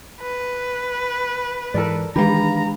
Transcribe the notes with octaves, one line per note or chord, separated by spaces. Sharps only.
B4
G#2 E3 A4 A#4 D5
D#3 E3 G#3 D4 G4 B4 F5 A#5